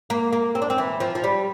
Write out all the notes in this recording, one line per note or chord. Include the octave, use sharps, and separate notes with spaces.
A#3
A#3
C4
D4
C4
E3
F3
F3
G3